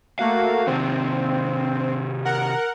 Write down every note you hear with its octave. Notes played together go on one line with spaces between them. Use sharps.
A3 A#3 F#4 F5
C3 D#3 C4
A#4 F#5